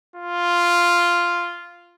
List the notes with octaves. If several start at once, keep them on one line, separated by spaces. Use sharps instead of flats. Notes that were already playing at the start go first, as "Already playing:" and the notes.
F4